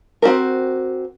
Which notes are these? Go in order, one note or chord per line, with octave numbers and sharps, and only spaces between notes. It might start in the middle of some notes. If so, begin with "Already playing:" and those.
C4 F#4 G4 A#4